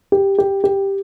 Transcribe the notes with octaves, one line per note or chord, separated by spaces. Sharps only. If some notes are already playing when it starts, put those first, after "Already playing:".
G4
G4
G4